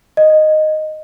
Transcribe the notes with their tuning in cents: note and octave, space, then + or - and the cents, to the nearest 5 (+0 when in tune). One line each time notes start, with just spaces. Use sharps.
D#5 -5